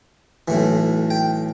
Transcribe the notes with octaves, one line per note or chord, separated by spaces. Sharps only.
B1 A2 E3
G5